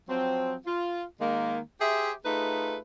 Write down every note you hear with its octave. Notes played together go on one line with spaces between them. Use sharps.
F3 F#3 C4
F4
D#3 G#3 A#3
G4 G#4 C5 E5
A3 D#4 F4 G#4 B4